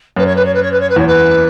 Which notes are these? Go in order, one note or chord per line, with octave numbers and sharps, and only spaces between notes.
F#2 B4
C#5
B4
C#5
B4
C#5
B4
C#5
B4
E2 C#5
B4